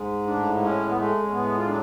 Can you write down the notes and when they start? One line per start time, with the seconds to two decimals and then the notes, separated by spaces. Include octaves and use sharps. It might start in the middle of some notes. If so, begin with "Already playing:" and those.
Already playing: G#2 G#3
0.26 A2 D4
0.61 G#3 C#4
0.89 B3
0.96 G#3 A3
1.24 C#4
1.31 A2 B3
1.58 F4
1.66 F#3 D4